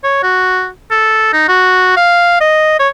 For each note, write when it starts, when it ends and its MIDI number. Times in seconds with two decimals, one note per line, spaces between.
0.04 0.19 73
0.23 0.68 66
0.91 1.31 69
1.33 1.46 63
1.48 1.94 66
1.97 2.37 77
2.41 2.76 75
2.79 2.88 73